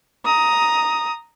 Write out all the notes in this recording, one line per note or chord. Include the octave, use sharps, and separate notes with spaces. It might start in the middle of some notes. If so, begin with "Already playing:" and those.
A#5 D#6